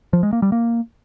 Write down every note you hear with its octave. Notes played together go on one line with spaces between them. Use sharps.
F3
G#3
A#3
G3
A#3